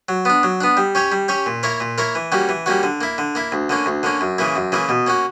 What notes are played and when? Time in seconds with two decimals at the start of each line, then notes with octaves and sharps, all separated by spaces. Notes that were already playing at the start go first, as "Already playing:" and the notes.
0.09 F#3
0.25 B3 D4
0.43 F#3
0.61 B3 D4
0.77 G3
0.95 C#4 G4 C#5
1.12 G3
1.28 C#4 G4 C#5
1.46 A#2
1.63 A#3 E4 A#4 C#5
1.80 A#2
1.98 A#3 E4 A#4 C#5
2.15 E3
2.32 G3 A#3 C#4 F#4
2.49 E3
2.66 G3 A#3 C#4 F#4
2.83 D3
3.01 A#3 E4
3.18 D3
3.35 A#3 E4
3.52 D2
3.69 D3 A#3 C#4
3.86 D2
4.03 D3 A#3 C#4
4.21 F#2
4.38 C#3 E3 A#3 E4
4.56 F#2
4.72 C#3 E3 A#3 E4
4.89 B2
5.07 A#3 C#4 F#4